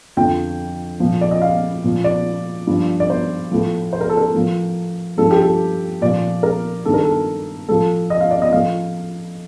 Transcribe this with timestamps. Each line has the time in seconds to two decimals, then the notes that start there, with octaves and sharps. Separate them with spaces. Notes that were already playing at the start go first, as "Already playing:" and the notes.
0.17 F2 D3 F3 G5
1.00 A#2 F3
1.21 D5
1.31 D#5
1.42 F5
1.83 A#2 F3
2.04 D5
2.67 G2 F3
3.00 D5
3.10 C5
3.52 A2 F3
3.93 C5
4.01 A#4
4.09 A4
4.17 A#4
4.34 A2 F3
5.18 G2 F3 A4
5.31 G4
5.42 A4
6.01 A#2 F3 D5
6.43 A#4
6.85 G2 D#3 A4
6.94 A#4
7.04 A4
7.68 A2 F3 A4
8.10 D#5
8.21 F5
8.31 D5
8.42 D#5
8.53 A2 F3 F5